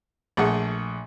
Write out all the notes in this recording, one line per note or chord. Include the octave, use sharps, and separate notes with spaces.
A#1 A3 G#4 F#5